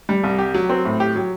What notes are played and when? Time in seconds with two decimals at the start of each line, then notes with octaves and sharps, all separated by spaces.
0.09 G3
0.23 C2
0.39 G4
0.54 F#3
0.69 C4
0.85 A2
1.00 G4
1.16 F#3